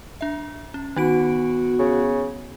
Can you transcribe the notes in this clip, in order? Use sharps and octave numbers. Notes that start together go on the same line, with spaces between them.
D4 E5
C#4
D#3 B3 D#4 F#4 D7
C#3